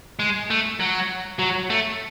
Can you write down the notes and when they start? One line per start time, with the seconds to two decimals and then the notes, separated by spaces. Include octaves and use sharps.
0.19 G#3
0.50 A3
0.80 F#3
1.39 F#3
1.70 A3